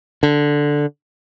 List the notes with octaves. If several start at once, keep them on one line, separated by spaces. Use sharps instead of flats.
D3